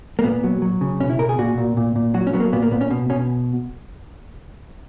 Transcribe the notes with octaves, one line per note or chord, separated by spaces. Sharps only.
A#3
A#2 B3
F#3
F#3
C#3
B2 C#4
E4
B2 A#4
G#4
A#2 F#4
A#2
A#2
A#2
F#3 F#4
C#4
F#3 B3
A#3
A#2 B3
A#3
A#2 B3
C#4
B2
B2 C#4